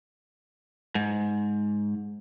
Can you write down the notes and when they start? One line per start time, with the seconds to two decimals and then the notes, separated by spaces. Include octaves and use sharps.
0.95 G#2